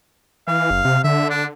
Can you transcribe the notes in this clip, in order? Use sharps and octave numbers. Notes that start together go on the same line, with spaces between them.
E3 F5
F#1
C3
D3 E5
D4